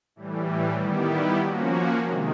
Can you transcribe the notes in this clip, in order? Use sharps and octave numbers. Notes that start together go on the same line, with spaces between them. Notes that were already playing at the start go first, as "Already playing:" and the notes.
A2 E3 G3
D#3 G3 B3 E4 G4
F3 A#3 C#4 F#4
C3 D#3 G#3